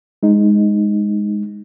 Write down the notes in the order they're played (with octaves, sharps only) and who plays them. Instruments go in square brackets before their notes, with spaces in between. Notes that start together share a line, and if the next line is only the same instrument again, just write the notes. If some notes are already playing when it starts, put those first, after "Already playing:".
[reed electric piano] G#3 D#4